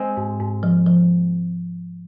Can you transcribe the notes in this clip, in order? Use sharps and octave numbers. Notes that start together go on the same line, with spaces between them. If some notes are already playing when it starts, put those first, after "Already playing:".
Already playing: G#3 C4
G#2
G#2
F3
F3